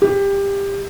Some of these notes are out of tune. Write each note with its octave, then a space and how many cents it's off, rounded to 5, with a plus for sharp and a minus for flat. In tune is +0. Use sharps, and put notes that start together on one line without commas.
G4 +20